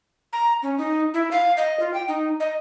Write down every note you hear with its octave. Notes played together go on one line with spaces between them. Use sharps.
A#5
C#4
D#4
E4
F5
D#5
F4
G5
D#4
D#5